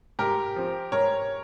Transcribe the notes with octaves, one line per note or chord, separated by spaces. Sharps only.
G#2 G4 A#4
F3 C4
G#2 A#4 C#5